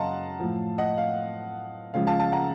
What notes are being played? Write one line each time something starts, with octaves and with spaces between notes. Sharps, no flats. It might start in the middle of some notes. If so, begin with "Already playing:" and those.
Already playing: F#2 C#3 D#5 F5 F#5 A5 A#5 C6
A2 F3
D#5 F#5
F5
C#2 C#3 F3 F5
F5 A5
F5 A5
F#5 A#5